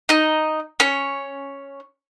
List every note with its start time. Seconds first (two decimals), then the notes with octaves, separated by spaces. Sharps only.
0.09 D#4 D#5
0.80 C#4 C#5